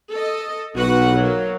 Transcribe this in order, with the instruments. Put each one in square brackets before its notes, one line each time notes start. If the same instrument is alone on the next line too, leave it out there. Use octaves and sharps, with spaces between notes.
[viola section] A4 D#5
[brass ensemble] B1 [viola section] F#4 B4 F#5
[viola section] F#3 A#3